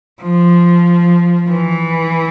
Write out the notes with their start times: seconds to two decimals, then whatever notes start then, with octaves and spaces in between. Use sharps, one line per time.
0.22 F3
1.50 E3